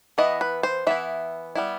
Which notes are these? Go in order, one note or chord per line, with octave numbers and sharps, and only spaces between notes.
E3 B3 E4 D#5
B4
C5
E3 B3 E4 E5
G3 B3 E4